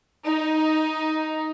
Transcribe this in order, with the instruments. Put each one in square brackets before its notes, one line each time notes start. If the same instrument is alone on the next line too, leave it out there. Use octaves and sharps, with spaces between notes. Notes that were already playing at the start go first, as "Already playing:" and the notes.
[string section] D#4